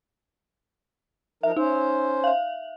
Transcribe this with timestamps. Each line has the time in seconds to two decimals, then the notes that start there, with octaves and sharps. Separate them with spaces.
1.43 F3 D#4 A#4 E5
1.57 C#4 D#4 C5
2.24 E5 F5